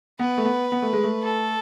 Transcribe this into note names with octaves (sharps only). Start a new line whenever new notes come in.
B3 B4
A3
B3
B3
A3
G#3
A3
A4